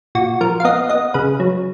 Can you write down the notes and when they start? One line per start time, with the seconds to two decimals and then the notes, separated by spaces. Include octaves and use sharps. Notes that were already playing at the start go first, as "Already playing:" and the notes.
0.15 A#2 F#4
0.41 F3 A#4
0.60 F5
0.65 B3 D#5
0.89 B3 D#5
1.14 C#3 B4
1.40 F#3